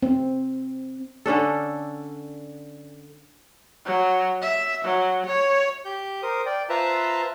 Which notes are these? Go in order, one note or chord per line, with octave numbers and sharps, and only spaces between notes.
C4
D3 C#4 D4 A4
F#3
E5
F#3
C#5
G4 G6
A#4 C5 D#6
D5 G5
F4 B4 C5 E5 A5 A#5